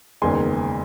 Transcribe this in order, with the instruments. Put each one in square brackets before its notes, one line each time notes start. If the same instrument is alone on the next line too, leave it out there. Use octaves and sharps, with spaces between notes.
[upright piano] F#1 E2 D#3 G#3 G#5 C6